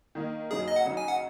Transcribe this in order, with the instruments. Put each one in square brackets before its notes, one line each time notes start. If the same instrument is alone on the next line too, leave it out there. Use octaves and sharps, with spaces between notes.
[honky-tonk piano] D#3 A#3 D#4
[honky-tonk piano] F#2 C#3 F#3 D#4 [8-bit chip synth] G#4
[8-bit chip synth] D#5
F#5
[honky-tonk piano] C#3 F#3 D#4
[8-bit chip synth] G#5
F#5